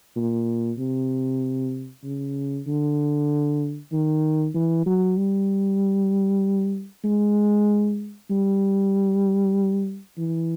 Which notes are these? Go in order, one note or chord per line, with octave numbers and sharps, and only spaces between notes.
A#2
C3
C#3
D3
D#3
E3
F#3
G3
G#3
G3
E3